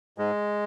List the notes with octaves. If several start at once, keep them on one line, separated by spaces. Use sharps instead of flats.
G#2 G#3